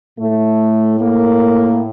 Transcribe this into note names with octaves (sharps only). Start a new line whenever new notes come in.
A2 A3
A#3